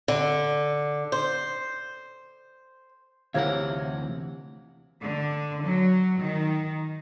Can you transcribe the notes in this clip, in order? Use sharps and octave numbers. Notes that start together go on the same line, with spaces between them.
D3
C5
D2 C3 E3 E4 A#4 C#5 F5 F#5
D3
F#3
D#3